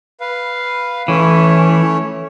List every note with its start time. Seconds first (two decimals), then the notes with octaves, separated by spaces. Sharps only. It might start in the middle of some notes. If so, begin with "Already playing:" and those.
0.20 B4 F5
1.08 E3 A3 C#4 C#5